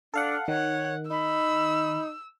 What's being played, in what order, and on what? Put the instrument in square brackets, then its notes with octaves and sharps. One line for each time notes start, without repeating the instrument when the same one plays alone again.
[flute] D4 [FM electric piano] A4 F5 F#5
[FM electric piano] D#3 [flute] C#5 [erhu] F#5
[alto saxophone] D#4 [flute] B5 [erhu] E6